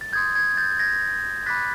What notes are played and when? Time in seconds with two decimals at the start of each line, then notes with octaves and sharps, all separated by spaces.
0.01 A6
0.13 C6 D#6 G6 G#6
0.36 G#6
0.57 G6 A6
0.79 G#6 A#6
1.46 B5 D6 F#6 A6 B6